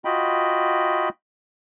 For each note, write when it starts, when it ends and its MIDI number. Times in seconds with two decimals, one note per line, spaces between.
0.05 1.09 65
0.05 1.09 66
0.05 1.09 75
0.05 1.09 79
0.05 1.09 83